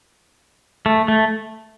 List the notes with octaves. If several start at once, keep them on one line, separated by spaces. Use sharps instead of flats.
A3
A3